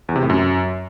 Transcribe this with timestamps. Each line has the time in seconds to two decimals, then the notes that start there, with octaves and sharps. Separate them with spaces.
0.09 E2
0.16 C3
0.23 A2
0.30 F#2